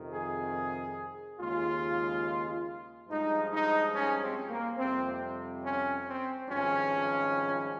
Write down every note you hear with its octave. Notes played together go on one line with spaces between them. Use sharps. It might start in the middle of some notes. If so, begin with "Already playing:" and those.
Already playing: F2 C3 D#3
G#4
D#2 C#3 G#3 F4
G2 F3 G#3 D#4
D#4
C#4
C4
A#3
F2 C3 G3 C4
C#4
C4
G#1 G2 F3 G#3 C#4